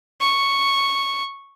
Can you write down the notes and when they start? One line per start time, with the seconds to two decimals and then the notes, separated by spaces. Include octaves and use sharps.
0.21 C#6